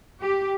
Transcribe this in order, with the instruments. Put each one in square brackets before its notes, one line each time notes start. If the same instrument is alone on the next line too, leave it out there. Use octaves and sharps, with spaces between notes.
[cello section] G4